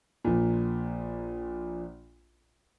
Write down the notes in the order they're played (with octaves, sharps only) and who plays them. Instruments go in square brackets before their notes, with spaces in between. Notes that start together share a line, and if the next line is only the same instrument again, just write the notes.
[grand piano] A#1 A#2